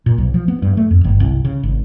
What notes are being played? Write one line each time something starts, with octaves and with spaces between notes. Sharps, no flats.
A#2
B1
F3
B3
G2
A3
F2
G1
C2
C#3
G#1